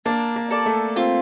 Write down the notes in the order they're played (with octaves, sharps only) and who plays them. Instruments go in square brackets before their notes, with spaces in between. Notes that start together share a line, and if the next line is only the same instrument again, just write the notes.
[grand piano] A#3 [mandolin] D4
[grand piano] A#3
[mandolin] A4 D5
[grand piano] A3
[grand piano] C4 [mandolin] F4